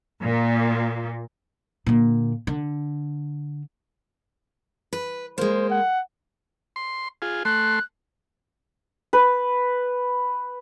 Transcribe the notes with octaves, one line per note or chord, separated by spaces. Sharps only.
A#2
A#2 D3
D3
B4
G#3 A#3 C5
F#5
C6
F4 G#4
A3 C6 F#6
B4